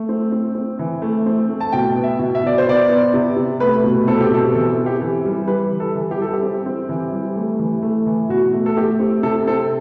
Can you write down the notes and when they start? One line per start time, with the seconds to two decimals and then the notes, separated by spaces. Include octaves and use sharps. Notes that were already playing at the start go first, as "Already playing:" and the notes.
Already playing: A3
0.09 C4
0.32 C4
0.55 C4
0.79 E3
1.02 A3
1.26 C4
1.49 A3
1.60 A5
1.72 B2 G5
1.96 B3
2.04 E5
2.19 B2
2.35 E5
2.44 B2 D5
2.58 C5
2.66 B3 D5
2.89 B3
3.14 C3
3.36 C3
3.60 A3 B4
3.84 B2
4.08 C4 A4
4.21 G4
4.31 B2 A4
4.54 E3 A4
4.77 C4
4.86 G4
5.01 E3
5.25 G3
5.48 G3 B4
5.71 E3
5.80 A4
5.96 E3
6.11 G4
6.18 G3 A4
6.33 G4
6.42 C4
6.66 C4
6.89 E3
7.12 G3
7.35 A3
7.59 E3
7.82 A3
8.06 E3
8.29 B2 F#4
8.53 A3
8.66 A4
8.77 A3 G4
8.99 C4
9.23 C3 A4
9.47 C4 A4